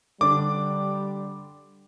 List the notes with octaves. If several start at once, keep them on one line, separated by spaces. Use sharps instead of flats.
D3 G3 D4 D6